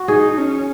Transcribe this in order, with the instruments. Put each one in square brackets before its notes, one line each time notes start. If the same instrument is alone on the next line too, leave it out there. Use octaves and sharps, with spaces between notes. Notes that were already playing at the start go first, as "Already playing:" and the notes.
Already playing: [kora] F#4
[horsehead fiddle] D#4 [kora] G#4
[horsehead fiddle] C#4